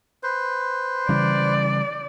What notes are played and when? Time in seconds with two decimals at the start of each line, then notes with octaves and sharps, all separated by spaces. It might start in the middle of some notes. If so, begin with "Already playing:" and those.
0.23 B4 C5
1.09 C#3 E3 G3 D5